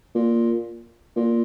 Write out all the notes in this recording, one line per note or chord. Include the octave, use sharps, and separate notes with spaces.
A#2
A#2